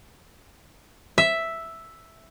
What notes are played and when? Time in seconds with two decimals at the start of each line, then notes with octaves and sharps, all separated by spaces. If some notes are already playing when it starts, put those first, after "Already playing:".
1.18 E5